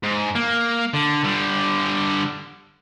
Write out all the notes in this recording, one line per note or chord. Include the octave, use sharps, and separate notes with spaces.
G#2
A#3
D3
D3 G3